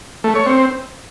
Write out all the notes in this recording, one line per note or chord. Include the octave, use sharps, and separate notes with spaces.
A3
C#5
C4